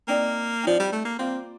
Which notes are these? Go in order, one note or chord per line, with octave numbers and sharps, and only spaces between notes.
A#3 C4 D#4 G4 D5
F3 C4 D#4 G4 D5
G3
A3
A#3
G3 A#3 C4 F4